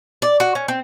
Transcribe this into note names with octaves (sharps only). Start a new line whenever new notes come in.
D5
F#4
C#4
C4